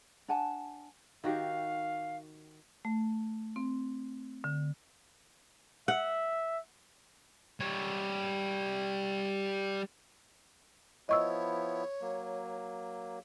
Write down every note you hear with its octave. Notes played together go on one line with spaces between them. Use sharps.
D4 F#5 G#5 A5
D#3 F#4 G4 F5
A3
C4
D3
E5 F#5
G3 C#5
F3 B3 E4 C#5 D#5 C#6 E6
F#3 A#3